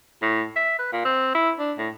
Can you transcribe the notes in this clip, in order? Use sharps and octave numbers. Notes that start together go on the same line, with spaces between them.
A2
E5
B4
A#2
C4
E4
D4
A2